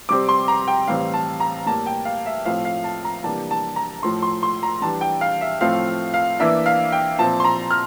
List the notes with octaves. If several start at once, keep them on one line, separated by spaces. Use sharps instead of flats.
C3 G3 C4 D6
C6
A#5
G5
A2 E3 G3 C4 F5
A5
A#5
A2 G3 A#3 A5
G5
F5
E5
A2 F3 A3 C4 F5
F5
A5
A#5
C3 E3 G3 A#3 D4 A5
A5
A#5
A2 F3 A3 C6
C6
C6
A#5
E3 G3 D4 A5
G5
F5
E5
A2 F3 A3 C4 F5
F5
E3 A#3 D4 E5
F5
G5
A#2 F3 C4 A5
C6
A#5
F6